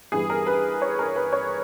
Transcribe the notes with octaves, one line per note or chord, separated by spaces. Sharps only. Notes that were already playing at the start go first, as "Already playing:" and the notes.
G2 E3 G3 B3 G#4
A#4
B4
C#5
A#4
B4
C#5